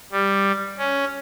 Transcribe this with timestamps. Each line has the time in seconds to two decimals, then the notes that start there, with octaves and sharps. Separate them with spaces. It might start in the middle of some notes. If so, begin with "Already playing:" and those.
0.12 G3
0.78 C#4